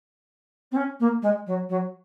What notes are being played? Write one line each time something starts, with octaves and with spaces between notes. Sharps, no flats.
C4
C#4
A#3
G#3
F#3
F#3